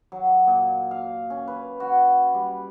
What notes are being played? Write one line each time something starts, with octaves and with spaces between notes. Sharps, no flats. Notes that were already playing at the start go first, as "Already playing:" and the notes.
F#3
A#2
F5
C#4
B4
F#4
G3